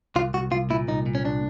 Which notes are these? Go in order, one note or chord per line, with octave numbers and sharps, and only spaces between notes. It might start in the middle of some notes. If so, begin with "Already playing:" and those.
C2 F4
C2 F#4
C2 F4
A#2 E4
C2 D#4
A#2
C#4
C2 D4